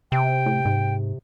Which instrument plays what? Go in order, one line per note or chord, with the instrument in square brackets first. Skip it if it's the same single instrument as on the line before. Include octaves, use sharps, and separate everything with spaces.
[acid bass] C3 [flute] G5
[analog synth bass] A2
G#2